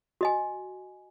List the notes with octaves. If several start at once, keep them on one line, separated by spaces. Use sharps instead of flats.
F#4 D#5 G#5